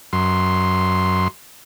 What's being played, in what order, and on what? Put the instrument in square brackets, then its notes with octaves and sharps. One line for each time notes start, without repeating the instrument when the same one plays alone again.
[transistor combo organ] F#2 C6